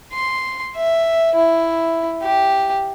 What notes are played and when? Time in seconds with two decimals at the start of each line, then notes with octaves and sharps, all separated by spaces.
0.13 C6
0.76 E5
1.35 E4
2.22 G4